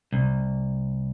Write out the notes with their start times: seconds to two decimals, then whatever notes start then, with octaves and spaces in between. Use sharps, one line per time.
0.12 C2